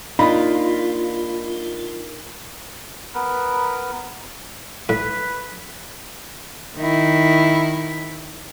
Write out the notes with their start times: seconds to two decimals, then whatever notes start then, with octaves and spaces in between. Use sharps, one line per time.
0.19 A#3 D4 D#4 F4 D#5 B5
3.14 B3 A#4 B4
4.89 A2 B4
6.77 D#3 E4